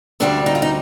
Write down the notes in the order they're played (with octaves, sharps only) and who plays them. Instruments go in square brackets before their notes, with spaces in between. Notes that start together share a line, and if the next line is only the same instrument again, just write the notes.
[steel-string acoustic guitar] D2 D3 G3 C4 D4
D#4
F4
D#4